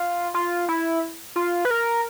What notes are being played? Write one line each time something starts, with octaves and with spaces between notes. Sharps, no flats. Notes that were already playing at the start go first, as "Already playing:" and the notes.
Already playing: F4
F4
E4
F4
B4
A#4